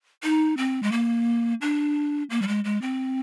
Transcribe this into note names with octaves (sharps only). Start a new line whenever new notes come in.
D#4
C4
G#3
A#3
D4
A#3
G3
G#3
G#3
C4